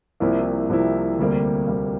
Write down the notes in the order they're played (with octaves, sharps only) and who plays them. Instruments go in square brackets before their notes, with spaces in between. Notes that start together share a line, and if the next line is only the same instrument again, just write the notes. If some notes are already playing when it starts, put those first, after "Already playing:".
[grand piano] C2 C3 F3 A#3 E4
C2 C3 F3 A#3 E4
D2 C3 G3 A#3
D2 C3 G3 A#3